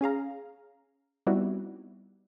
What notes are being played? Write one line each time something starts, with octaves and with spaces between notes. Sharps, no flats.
C#4 G#4 F5 A#5
G3 B3 C4 D#4 E4 F#4